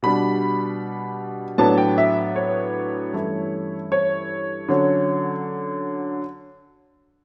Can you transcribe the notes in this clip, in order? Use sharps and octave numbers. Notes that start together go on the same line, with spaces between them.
B2 G3 D4 B5
A2 F#3 B3 D4 A5
G5
E5
C#5
G2 E3 A3 C#4 E4
C#5
D3 F#3 C#4